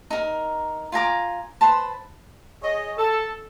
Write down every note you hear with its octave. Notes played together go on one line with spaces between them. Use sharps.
D#4 A#4
F4 G#5 A#5 D6
B4 C5 A5
G#4 C#5 D#5
A4